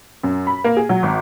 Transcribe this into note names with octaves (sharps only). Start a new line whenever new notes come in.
F#2
B5
A#3
G#4
F#3
G#1